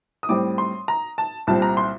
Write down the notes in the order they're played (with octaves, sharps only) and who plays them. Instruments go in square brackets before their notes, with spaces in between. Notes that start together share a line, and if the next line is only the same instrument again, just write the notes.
[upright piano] D#6
A2 G3 C4 D6
C6
A#5
A5
C2 A#2 G3 C4 A5
A#5
C6